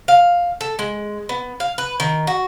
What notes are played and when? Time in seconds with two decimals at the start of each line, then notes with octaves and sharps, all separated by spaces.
0.08 F5
0.61 A4
0.79 G#3
1.29 B3
1.60 F5
1.78 B4
2.00 D#3
2.27 F#4